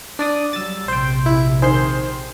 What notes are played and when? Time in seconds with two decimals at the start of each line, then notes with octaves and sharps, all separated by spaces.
0.19 D4 D5 D#6
0.53 F#3 G3 E6 A6
0.88 A#1 C3 C5 G5
1.26 E4
1.62 D#3 G#4 C5 C6